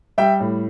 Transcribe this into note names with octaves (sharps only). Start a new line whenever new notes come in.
G3 E5 G5
A2